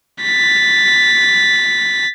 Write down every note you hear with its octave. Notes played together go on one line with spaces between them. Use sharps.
A6 B6